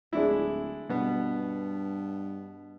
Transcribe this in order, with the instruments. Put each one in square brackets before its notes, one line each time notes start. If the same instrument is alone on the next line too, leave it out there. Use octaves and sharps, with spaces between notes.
[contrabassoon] D1 [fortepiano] G#3 D4 E4
[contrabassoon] G2 [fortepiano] B2 B3